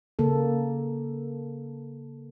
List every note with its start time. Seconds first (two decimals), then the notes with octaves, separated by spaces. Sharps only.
0.19 C#3 A#3 A4